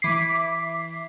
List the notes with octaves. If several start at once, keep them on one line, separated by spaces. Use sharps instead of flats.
E3 D6 B6 C7